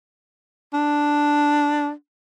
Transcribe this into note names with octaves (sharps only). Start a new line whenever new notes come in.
D4